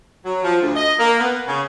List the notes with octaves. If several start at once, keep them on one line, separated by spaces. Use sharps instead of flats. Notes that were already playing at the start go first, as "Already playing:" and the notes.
F#3
F3
D2
D#5
A#3
B3
C#3